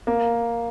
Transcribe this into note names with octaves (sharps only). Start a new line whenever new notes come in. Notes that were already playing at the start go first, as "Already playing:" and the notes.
A#3